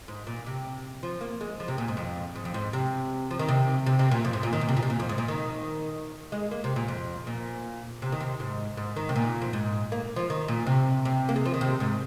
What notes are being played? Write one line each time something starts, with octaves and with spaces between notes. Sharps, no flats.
G#2
A#2
C3
F3
A#3
G#3
F3
C3
A#2
G#2
F2
G#2
F2
G#2
C3
F3
D#3
C3
C3
C3
A#2
F2
G#2
A#2
D#3
A#2
C3
A#2
C3
A#2
F2
G#2
A#2
D#3
G#3
A#3
C3
A#2
F2
A#2
C3
D#3
C3
G#2
G#2
D#3
C3
A#2
F2
G#2
A#3
F3
D#3
A#2
C3
C3
A#3
G#3
F3
D#3
C3
G#2